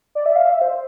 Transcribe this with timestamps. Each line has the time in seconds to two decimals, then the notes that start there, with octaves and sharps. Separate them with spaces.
0.15 D5
0.26 E5
0.36 F5
0.46 E5
0.61 C5